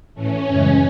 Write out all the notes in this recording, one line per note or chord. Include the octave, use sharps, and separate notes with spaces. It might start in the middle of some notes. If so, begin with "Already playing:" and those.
A2 E3 A3 C#4
F#2 C#3 E3 G#3